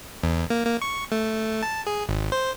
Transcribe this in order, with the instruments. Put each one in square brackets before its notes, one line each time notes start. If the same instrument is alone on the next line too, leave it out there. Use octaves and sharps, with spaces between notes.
[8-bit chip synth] E2
A#3
A#3
C#6
A3
A5
G#4
G#1
C5